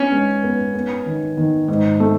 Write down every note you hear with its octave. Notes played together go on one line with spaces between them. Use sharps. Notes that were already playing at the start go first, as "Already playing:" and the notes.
Already playing: B3 C#4
G#3
B3
B3
D#3
D#3
G#2
A3